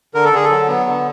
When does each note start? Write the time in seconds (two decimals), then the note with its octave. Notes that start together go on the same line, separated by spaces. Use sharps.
0.14 D3 A#4
0.25 A4
0.33 D3 G#4
0.45 A4
0.50 F#3
0.68 B3
0.86 D3